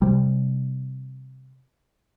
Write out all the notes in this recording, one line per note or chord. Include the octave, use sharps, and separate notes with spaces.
C3 G3